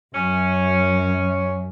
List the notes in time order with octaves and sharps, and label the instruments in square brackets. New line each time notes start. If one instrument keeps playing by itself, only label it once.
[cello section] F#2 [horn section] C#4